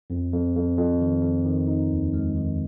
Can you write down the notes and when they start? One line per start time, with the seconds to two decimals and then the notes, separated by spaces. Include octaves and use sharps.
0.10 F2
0.32 F2
0.56 F2
0.78 F2
1.01 D#3
1.23 F2
1.45 D#3
1.68 D#4
1.90 D#2
2.13 G#3
2.36 D#3